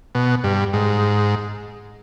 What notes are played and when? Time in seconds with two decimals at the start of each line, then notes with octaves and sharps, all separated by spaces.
0.15 B2
0.44 G2
0.73 G#2